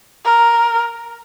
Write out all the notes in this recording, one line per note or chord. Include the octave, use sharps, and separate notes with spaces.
A#4